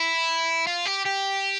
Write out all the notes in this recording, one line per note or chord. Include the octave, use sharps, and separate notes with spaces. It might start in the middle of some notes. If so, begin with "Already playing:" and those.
Already playing: E4
F4
G4
G4